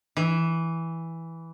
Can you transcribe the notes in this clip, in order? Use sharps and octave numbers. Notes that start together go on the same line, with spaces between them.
E3